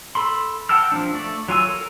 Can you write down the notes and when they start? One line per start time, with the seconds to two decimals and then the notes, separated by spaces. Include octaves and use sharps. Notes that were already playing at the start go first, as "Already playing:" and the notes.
0.15 A4 B5 C6
0.69 F#5 G5 A5 E6 F6
0.92 F3 A#3 D4
1.14 A3 D5
1.48 F#3 F4 G#5 E6
1.68 A4 A#4